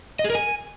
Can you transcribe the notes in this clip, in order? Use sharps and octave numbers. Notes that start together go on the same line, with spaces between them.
D#5
G#4
A#4
G#5